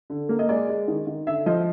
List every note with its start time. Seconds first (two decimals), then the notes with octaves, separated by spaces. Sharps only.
0.10 D3
0.29 A#3
0.39 D#5
0.49 G#3 D5
0.69 G#3
0.88 D#3
1.07 D#3
1.27 D3 E5
1.46 F3 D#5